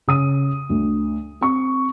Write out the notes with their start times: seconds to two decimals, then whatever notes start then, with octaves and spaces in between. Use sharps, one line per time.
0.08 C#3 D#6 D#7
0.69 D2
1.41 C4 C#6